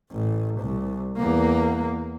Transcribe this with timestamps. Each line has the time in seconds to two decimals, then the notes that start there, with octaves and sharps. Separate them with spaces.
0.12 A1
0.61 C2
1.17 E2 A#3